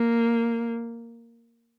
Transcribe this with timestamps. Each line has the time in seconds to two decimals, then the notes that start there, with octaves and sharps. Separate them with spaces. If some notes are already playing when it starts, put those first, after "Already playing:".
Already playing: A#3